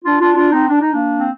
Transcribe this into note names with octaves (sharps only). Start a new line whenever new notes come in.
D4 F4
D4 F4
D4 F4
C4 D#4
D4
D#4
A#3 D4
C4